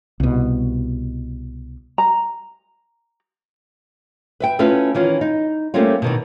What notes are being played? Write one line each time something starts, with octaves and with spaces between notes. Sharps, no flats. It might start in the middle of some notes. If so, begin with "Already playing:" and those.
C2 B2
A#5
B4 E5 G5
A3 C#4 E4 F4 B4
D#3 E3 C#4 F4
D#4
G3 A3 A#3 C4 C#4 F4
B2 D#3 E3